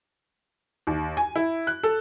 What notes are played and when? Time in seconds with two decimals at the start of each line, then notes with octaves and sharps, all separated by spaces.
0.87 D#2
1.17 G#5
1.36 E4
1.67 F#6
1.83 A4